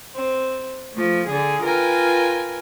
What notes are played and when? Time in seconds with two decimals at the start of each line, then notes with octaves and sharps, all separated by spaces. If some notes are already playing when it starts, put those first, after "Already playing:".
0.15 C4
0.93 F3 A3
1.25 D3 G#4
1.62 F4 A#4 B4 G5 G#5